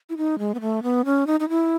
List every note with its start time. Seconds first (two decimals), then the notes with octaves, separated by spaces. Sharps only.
0.10 E4
0.17 D#4
0.39 G#3
0.54 B3
0.61 A3
0.83 B3
1.05 C#4
1.27 D#4
1.40 D#4
1.49 E4